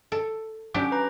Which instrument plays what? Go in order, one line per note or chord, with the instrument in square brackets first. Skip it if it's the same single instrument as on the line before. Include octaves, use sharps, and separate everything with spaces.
[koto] A4
[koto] F#3 D4 G4 [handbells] C#4 D6
[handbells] B4 A#5